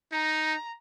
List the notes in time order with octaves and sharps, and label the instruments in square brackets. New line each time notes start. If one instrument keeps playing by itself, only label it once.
[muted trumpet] D#4 [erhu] A#5